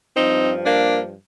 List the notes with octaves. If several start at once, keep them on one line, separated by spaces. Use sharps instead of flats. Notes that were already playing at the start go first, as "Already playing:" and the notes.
G2 F3 C4 D#4
A#3 D4